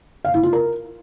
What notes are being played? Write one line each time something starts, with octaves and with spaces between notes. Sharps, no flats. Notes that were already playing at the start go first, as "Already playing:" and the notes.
F5
E4
F4
A#4